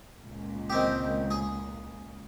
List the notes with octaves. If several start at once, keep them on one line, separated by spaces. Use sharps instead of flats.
C#2 A#2
D#3 C4 G4
G#4